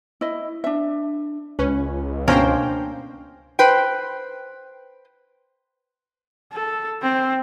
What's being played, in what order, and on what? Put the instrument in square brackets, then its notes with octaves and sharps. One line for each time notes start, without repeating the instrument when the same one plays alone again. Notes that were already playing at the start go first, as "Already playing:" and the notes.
[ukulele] E4 D#5
D4 E5
[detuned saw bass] C#2 [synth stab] C#4 [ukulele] B4
[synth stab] B2 C5 G5 [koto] A#3 C#4 A#4 [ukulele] D4
[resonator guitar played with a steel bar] B4 C5 G5
[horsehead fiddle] A4
C4